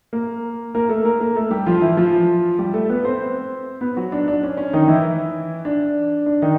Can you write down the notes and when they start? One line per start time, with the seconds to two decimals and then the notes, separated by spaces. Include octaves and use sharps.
0.13 A#3 A#4
0.75 A#3 A#4
0.89 A3 A4
1.05 A#3 A#4
1.20 A#3 A#4
1.36 A3 A4
1.51 G3 G4
1.66 F3 F4
1.81 E3 E4
1.97 F3 F4
2.59 G3 G4
2.74 A3 A4
2.89 B3 B4
3.05 C4 C5
3.81 B3 B4
3.96 F#3 F#4
4.12 D4
4.28 D4
4.43 C#4
4.57 C#4
4.73 D#3 D#4
4.88 E3 E4
5.65 D4
6.26 D4
6.42 D#3 D#4